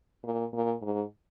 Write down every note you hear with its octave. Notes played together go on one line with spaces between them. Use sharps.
A#2
A#2
G#2